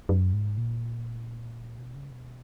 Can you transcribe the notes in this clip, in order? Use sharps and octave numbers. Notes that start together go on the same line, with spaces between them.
F#2
G#2
A#2
B2
C#3
B2